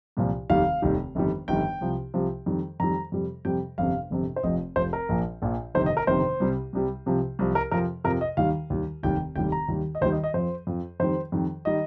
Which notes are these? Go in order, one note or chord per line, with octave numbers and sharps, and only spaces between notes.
C2 A#2 F3
F1 D#2 D#3 G3 F5
F1 D#2 D#3 G3
G1 F2 D#3 G3
G1 F2 D#3 G3 G5
C2 C3 F3
C2 C3 F3
F2 D#3 G3
F2 D#3 G3 A#5
F2 C3 G3
F2 C3 G3 G5
G1 F2 C3 F5
G1 F2 C3
C5
F1 F2 F3 D#5
F1 F2 F3 C5
A#4
A#1 A#2 F3
A#1 A#2 F3
G1 F2 C3 D#3 C5
D#5
A#4
G1 F2 C3 D#3 C5
C2 C3 G3
C2 C3 G3
C2 C3 F3
C2 C3 F3
A#4
F2 C3 F3 A#4
F2 C3 F3 A#4
D#5
D#2 D#3 G3 F5
D#2 D#3 G3
F1 D#2 D#3 G3 G5
F1 D#2 D#3 G3 G5
A#5
D#2 D#3 G3
D#5
D#2 D#3 G3 C5
D#5
D#5
F2 F3 C5
F2 F3
F2 D#3 G3 C5
F2 D#3 G3
D#3 G3 D#5